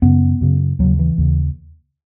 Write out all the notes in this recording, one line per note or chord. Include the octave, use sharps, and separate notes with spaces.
F#2 C#3 B3
F#2 C#3
D#2 C#3 F#3
E3
D#2 C#3